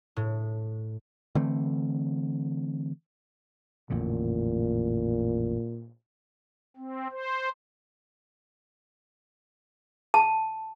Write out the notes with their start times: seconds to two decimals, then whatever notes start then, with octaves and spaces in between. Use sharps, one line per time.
0.16 A2
1.35 D3 E3 A3 C4
3.90 A1 F2 A#2 D3
6.77 C4
7.12 C5
10.14 A5